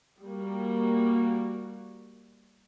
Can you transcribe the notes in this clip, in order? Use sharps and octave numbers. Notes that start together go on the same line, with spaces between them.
G3 A#3 F#4